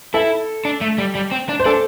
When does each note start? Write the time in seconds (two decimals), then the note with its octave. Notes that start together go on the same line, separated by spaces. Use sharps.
0.14 E4 A4
0.65 D4
0.81 A3
0.98 G3
1.15 G3
1.31 C4
1.49 D4
1.60 C5
1.65 D4 A4